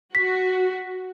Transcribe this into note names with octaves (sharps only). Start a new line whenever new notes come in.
F#4 B6